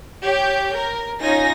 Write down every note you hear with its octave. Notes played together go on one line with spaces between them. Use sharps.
G4 C#5 G6
A#4
C#4 D#4 F4 G#5 A#6